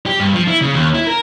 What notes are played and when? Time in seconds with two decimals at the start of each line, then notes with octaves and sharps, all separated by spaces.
0.06 G4
0.20 G2
0.33 F3
0.48 E4
0.61 C#3
0.75 D#2
0.94 E4
1.07 A#4